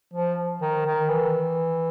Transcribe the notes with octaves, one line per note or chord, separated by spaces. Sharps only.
F3
D#3
D#3
E3